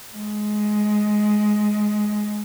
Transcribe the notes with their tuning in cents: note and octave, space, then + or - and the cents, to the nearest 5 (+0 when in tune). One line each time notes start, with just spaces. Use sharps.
G#3 +15